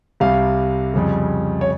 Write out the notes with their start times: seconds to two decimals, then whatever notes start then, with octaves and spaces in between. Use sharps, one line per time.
0.20 C2 C3 G3 F5
0.94 F2 C#3 G3
1.61 C#5